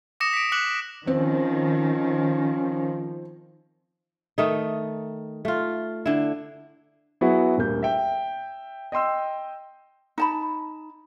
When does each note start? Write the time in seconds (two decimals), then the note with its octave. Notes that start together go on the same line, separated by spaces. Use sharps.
0.20 D6 D#6 A#6 C#7 E7
0.33 B6 D7
0.52 D6 F#6 B6 C#7 F#7
1.07 D#3 F3 C4 C#4
4.38 D#3 A3 D#4
5.45 A3 F4
6.06 D3 E4
7.21 F#3 B3 E4 F#4 G#4
7.58 D#1 D2 A#3 G6
7.83 E5 G5
8.92 D#5 G5 C6 E6
10.18 D#4 A5 B5